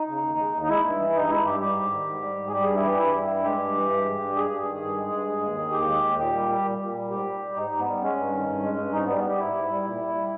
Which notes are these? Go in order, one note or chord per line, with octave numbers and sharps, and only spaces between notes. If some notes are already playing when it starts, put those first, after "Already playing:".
Already playing: D#4
C#3
D#2
G#3
D#2
D#4
G#3 E4
G2
E3
G2 D#4
G#3 E4
G2 G4
G3 G4
G#2
D#3
G#2
G3
G#2
G#4
G3 G4
G2 G#4
E4
E3 G4
G2 E4
G3
G2
G#3 G4
G2
E3
G2
G#3
G2
G#3 G#4
G2
D#3
G2
G#3
G2
G#3
D#2
D#3
D#2 G4
G#3
D#2
A#2 G4
G3
G3
A#2
A#2
G3
G#2 G4
G3
G3
G#2 D#4
G#2
B3
G3
G#3 C#4
G2
D#3
G2
G#3
G2
G#2 D#4
B3
G3
B3
G3 G4
G#2 E4
G#2
G3
A#2
G3
G3